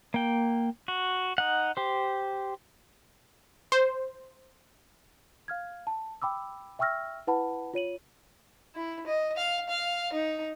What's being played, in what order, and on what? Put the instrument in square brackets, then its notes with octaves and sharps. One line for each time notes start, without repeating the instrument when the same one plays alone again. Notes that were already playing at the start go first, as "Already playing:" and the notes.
[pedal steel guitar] A#3 G5
F#4
D#4 F#5
G4 C5
[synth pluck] C5
[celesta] F5 F6 G#6
A5
G5 B5 D6 E6
E5 G5 C#6 E6 F6 A#6
E4 B4 F#5 A5 B5
F4 C#5 D#7 F#7
[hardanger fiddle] E4
D#5
F5
F5
D#4